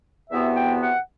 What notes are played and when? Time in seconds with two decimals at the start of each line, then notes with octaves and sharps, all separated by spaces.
0.30 E2 C3 E3 B3 F#4 E5
0.56 G5
0.81 F#5